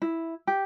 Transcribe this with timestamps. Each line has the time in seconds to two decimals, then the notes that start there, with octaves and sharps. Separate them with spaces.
0.02 E4
0.47 G4